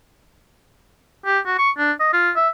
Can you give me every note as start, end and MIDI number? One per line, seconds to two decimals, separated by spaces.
1.26 1.39 67
1.46 1.56 66
1.58 1.70 85
1.78 1.92 62
2.00 2.12 75
2.13 2.31 65
2.36 2.49 76